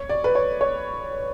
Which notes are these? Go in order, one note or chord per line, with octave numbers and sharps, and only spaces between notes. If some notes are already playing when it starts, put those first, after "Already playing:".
Already playing: C#5
D5
B4
C#5
C#5